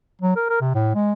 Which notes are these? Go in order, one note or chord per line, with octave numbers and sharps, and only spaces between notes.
F#3
A#4
A#4
C3
A2
G#3